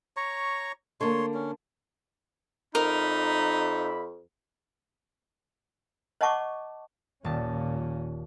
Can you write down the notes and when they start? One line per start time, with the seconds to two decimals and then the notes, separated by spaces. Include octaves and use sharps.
0.17 C#5 A#5 C#6
1.01 D3 A#3 C#5 C6
1.34 C#4
2.75 F2 D#4 A#4 D5 E5 B5
6.21 C#5 D#5 F#5 A5 C#6 D6
7.24 D#1 A#2 C#4 A5